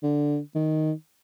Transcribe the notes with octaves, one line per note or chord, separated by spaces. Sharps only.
D3
D#3